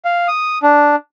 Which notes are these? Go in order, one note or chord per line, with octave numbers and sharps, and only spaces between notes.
F5
D#6
D4